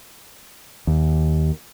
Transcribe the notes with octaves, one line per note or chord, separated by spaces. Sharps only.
D#2